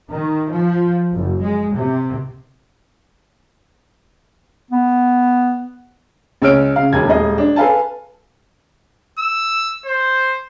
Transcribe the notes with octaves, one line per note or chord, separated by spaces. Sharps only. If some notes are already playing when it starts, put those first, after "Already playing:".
D#3
F3
F#1
G#3
C3
B3
C#2 C#4 E6 F6 D7
C#3 F5
E1 D#2 G#6
D#1 G#3 D#5
D4
A4 B4 F5 G#5 A5
E6
C5